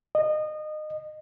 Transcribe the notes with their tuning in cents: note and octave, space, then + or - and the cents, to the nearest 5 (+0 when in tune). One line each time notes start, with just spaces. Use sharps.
D#5 -25